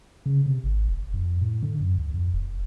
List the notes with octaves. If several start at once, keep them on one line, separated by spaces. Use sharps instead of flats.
C#3
C3
G#1
E1
F2
A2
D3
F#2
D2
F2
E1